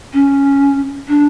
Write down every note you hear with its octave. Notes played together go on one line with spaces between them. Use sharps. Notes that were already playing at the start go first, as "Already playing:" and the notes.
C#4
D4